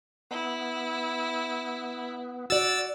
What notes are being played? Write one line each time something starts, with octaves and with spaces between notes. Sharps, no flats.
B3 E4
F#4 D5 E6 A6